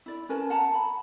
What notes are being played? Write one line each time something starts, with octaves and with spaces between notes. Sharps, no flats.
E4 D5
C#4 A#4 B4 A5
F#5 A5 A#5
B5